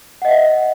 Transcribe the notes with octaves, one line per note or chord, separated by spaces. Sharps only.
D#5 E5 F#5